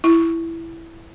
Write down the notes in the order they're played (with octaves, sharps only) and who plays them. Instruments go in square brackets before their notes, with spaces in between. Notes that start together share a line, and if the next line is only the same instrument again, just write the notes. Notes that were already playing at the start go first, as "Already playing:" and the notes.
[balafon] E4